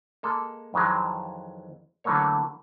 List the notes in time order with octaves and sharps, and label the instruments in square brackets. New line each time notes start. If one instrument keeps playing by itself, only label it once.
[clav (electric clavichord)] G#3 A#3 A4
F2 D#3 E3 F#3 G#3
D3 E3 F#3 A3 A#3 C#5